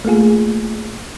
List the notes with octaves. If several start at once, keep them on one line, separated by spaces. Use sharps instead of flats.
A3 A#3 F4 G#4